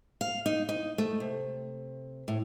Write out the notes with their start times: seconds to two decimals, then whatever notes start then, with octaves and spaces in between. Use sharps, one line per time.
0.21 F5
0.46 D#4
0.69 D#4
0.98 A3
1.20 C3
2.28 A2